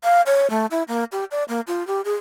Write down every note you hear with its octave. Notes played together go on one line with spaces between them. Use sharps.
F5
C#5
A3
E4
A#3
G4
D5
A#3
F4
G4
G#4